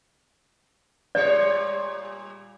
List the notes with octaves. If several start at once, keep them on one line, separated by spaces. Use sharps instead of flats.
A#2 G3 C#5 D5